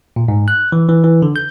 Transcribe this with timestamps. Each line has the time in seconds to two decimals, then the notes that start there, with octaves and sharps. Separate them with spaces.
0.16 A#2
0.28 G#2
0.48 F#6
0.72 E3
0.89 E3
1.04 E3
1.22 D3
1.36 G6